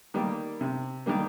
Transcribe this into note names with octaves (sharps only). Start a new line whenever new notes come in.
D#3 G3 A#3
C3
D#3 G3 A#3